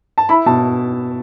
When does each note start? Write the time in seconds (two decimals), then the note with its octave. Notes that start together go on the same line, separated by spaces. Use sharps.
0.18 A5
0.29 E4 B5
0.46 B2 A5